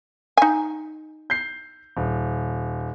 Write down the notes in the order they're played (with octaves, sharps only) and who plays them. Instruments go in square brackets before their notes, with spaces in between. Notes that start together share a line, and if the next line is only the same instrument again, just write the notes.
[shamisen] D#4 G#5
[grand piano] G6 C7
D#1